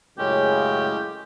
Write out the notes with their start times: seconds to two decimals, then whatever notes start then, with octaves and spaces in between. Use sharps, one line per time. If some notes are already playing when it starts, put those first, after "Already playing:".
0.18 F#2 A2 C#3 G#3 C#4 G4